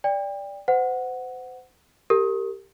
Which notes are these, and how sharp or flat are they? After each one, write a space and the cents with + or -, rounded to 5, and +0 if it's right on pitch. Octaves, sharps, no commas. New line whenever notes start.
D5 -10 G5 +30
C5 -35 F#5 +0
G4 +0 A#4 -30